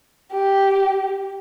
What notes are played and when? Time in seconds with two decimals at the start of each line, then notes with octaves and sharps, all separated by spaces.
0.33 G4